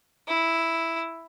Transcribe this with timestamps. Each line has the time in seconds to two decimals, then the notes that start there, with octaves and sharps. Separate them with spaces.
0.28 E4